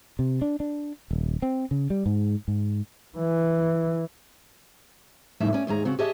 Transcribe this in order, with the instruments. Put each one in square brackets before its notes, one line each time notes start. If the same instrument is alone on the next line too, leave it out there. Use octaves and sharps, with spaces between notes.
[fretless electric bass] C3
D4
D4
D#1
C4
C#3
G3
G#2
G#2
[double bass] E3
[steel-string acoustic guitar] F2 A2 C#3 G3 D#4 E5
C#4 D5
D#2 G#2 G#4 A#5
C#3 C4 F#4
G4 G#4 C#5 D#5 E5 A5